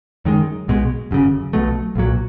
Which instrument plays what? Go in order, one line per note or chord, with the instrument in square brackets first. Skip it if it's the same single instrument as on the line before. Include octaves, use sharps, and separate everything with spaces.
[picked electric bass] F#2 D#3 G#3
B1 B2 G#3
G1 F#2 C#3
B1 B2 F#3 A3
B1 A#2 F#3